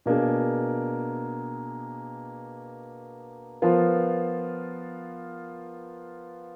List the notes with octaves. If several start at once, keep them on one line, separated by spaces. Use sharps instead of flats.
B2 A#3 D4 G#4
F3 B3 F4 A#4